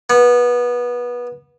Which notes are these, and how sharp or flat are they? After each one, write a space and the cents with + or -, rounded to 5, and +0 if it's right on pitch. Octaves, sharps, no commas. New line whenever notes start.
B3 -20